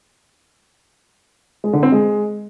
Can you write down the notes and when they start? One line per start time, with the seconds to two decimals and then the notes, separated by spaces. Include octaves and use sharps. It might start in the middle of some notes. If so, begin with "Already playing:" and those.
1.64 G#3
1.73 D3
1.83 C4
1.92 G#3